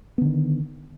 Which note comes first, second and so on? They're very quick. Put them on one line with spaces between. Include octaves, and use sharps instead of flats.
B3 D3 D#3